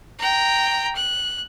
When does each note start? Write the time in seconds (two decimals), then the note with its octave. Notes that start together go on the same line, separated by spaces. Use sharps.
0.19 G5 A#5
0.95 F#6